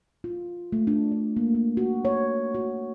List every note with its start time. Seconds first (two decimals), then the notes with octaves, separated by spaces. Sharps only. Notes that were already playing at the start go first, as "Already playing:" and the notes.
0.24 F4
0.72 A3
0.87 D4
1.11 D4
1.37 A#3
1.55 A#3
1.77 F#4
2.05 C#5
2.55 F#4